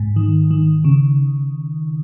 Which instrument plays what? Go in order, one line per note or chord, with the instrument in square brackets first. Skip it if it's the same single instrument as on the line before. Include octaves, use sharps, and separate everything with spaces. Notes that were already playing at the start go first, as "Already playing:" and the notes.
Already playing: [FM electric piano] G#2
D#3
D#3
C#3